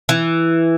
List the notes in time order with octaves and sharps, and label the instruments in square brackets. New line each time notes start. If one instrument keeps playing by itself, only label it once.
[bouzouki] E3